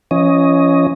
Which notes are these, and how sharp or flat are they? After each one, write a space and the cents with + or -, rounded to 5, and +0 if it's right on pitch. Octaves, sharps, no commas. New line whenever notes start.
F3 -40 C#4 +0 D#5 +5